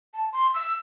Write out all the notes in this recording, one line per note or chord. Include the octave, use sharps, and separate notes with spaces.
A5
C6
E6